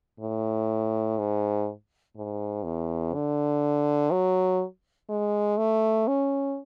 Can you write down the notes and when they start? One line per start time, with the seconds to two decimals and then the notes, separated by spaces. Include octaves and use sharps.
0.20 A2
1.19 G#2
2.16 G#2
2.65 E2
3.14 D3
4.12 F#3
5.09 G#3
5.58 A3
6.08 C#4